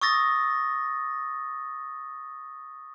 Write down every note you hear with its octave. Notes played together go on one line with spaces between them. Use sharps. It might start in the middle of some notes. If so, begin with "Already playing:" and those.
C#6 D#6 E6 A6 A#6